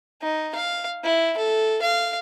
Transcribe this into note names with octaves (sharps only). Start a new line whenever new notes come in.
D#4
F5
E4
A4
F5